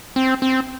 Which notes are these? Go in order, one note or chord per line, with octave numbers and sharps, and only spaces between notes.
C4
C4